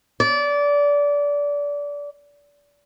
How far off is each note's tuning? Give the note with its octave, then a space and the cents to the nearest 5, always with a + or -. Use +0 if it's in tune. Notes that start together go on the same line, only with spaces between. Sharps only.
D5 -25